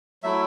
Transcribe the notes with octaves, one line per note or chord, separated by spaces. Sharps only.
F#3 A3 E4 E5